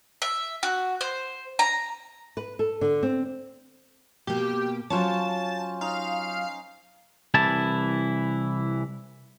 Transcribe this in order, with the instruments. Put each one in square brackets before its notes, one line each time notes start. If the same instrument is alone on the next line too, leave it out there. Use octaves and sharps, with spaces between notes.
[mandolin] E5
F#4
C5
A#5
[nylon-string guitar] B4
A4
D3
C4
[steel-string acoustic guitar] B2 A#3 [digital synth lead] G4
[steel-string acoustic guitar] F#3 F4 C#5 [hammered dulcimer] C#4 C5 F5 [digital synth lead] A5
[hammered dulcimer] D#4 [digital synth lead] F5
[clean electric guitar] C2 E3 E4 A5